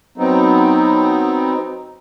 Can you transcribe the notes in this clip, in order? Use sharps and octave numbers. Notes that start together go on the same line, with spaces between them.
F#3 B3 C4 D#4